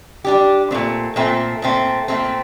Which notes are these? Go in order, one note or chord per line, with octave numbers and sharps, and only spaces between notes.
G3 D4 G4
A#2 A3 C4
A#2 A3 C4
A#2 A3 C4
A#2 A3 C4